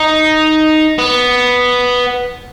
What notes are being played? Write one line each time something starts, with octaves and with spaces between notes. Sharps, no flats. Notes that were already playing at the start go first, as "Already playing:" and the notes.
Already playing: D#4
B3